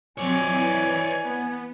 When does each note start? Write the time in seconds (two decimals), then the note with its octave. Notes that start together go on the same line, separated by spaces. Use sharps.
0.18 F3 F#3 C4 C#5 D5 G#5
0.49 E3
1.22 B3